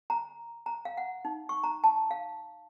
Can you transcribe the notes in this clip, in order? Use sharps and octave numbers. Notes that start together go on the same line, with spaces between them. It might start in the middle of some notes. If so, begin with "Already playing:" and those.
A#5
A#5
F5
F#5
D#4
C#6
A#5
A5
F5